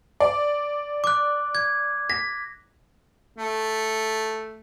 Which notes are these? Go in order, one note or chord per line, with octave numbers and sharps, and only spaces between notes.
D5
D6 F#6
G#6
A#6 B6
A3